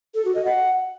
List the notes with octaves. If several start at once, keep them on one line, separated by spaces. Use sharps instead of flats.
A4
F#4
D#5
F#5